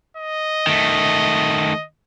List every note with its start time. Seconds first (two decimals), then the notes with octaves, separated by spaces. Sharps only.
0.17 D#5
0.67 D#3 A3